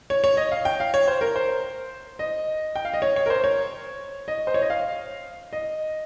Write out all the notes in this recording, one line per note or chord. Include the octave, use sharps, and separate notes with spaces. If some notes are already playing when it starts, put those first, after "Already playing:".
C#5
C#5
D#5
F5
G5
F5
C#5
C5
A#4
C5
D#5
G5
F5
D#5
C#5
C#5
A#4
C5
C#5
D#5
C5
C#5
D#5
F5
D#5